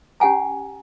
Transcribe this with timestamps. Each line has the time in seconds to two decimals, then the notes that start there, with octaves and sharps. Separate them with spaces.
0.20 C#4 G4 F#5 G#5 A#5